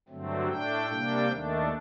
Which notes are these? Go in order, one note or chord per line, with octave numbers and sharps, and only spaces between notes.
G2 D3 F#3 A3 C4
A2 A3 D4 G5
C3 G3 A#3 D4
D#2 D#3 A3 D4